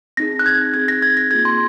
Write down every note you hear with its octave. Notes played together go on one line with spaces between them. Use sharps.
C4 D#4 G#4 A#6
F#6
G#6
C4 D#4 G#4 G#6
A#6
G#6
A#6
A#3 F4 G#4 G#6
C6